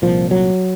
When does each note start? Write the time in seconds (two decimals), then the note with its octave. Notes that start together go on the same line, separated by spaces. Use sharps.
0.02 C2 A#2 F3
0.31 F#3